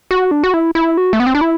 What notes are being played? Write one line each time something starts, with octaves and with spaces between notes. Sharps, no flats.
F#4
D4
F#4
E4
E4
F#4
A3
B3
C4
D4
E4